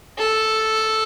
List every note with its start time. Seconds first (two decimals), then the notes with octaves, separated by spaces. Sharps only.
0.18 A4